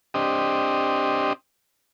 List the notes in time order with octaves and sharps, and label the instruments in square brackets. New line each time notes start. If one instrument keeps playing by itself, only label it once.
[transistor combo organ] C4 D4 G4 D#5